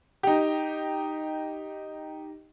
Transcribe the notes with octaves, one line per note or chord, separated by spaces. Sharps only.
D#4 G4